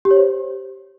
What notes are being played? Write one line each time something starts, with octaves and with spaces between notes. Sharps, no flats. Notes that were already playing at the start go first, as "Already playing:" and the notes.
G4
C#5
C5